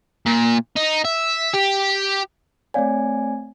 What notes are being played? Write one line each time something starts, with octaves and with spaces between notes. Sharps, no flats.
A#2
D#4
E5
G4
A3 C4 C#5 D5 F5 G#5